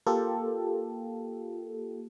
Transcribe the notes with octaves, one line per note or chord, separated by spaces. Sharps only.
A#3 F4 G4 A4